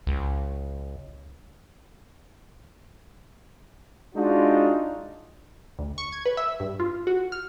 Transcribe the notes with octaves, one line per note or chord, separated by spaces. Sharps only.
C#2
G#3 D4 D#4 F4 F#4
D2
C#6
G#6
B4
E5
G2
F4
F#4
F6